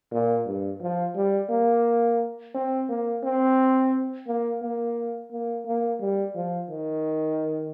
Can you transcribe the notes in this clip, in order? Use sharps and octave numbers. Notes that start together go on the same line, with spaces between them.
A#2
G2
F3
G3
A#3
C4
A#3
C4
A#3
A#3
A#3
A#3
G3
F3
D#3